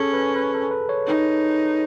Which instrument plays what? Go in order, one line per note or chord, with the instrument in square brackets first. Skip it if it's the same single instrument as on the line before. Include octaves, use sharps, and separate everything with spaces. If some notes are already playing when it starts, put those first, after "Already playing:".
Already playing: [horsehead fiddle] C#4 [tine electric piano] G#4 A4
[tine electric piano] B4
B4
A4
B4
C#5
[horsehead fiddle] D#4